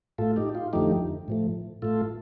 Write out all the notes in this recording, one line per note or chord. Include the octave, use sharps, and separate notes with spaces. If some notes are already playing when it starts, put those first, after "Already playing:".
A2 A3 F4 A4
D#4 G4
F4
F2 D3 F3 A3 D#4 G4
A2 F3 A3
A2 A3 F4 A4